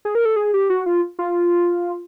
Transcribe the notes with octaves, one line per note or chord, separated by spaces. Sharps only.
G#4
A#4
A4
G#4
G4
F#4
F4
F4